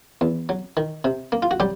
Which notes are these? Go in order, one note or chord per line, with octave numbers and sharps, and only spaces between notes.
E2
F#3
D#3
C3
A#3
F4
F#4
F#3 G3 G4